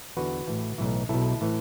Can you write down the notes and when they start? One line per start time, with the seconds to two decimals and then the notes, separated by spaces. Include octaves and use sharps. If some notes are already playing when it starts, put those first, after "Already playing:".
0.17 E2 D3 F#4 B4
0.47 A1 A2 E3
0.78 B1 A2 E3
1.09 B1 B2 E4 A4
1.41 A2 E3